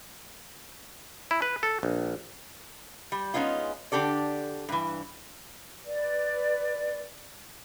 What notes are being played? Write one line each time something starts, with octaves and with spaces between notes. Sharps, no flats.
E4
B4
A4
A#1
G3
G#3 B3 C#4 D#4 F4
D3 D4 G4 A4 D5
G2 E3
B4 D5